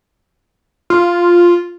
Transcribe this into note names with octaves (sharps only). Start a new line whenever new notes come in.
F4